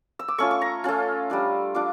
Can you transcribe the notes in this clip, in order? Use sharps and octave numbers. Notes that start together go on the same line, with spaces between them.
E6
D6
A3 C#4 F4 C#6
C#6
A#5
A3 C#4 F4
G3 D4 F4
D4 F4 D6